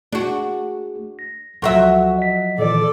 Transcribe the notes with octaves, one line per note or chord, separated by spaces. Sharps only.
A3 D4 F#4 G#4
A#6
C#2 F3 F#3 A4 E5 C#6
D#5 B6
A#2 D#3 E3 A4 D5